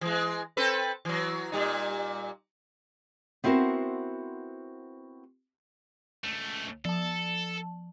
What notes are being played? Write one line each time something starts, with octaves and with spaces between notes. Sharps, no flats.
E3 G#3
C4 A4 B4
E3 F#3
A#2 G3 D#4
B3 C4 E4 F#4 A#4 C5
C#2 A3
F3 A4 A5